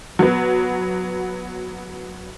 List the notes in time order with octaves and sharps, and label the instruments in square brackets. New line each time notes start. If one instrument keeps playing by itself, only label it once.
[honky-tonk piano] F#3 B3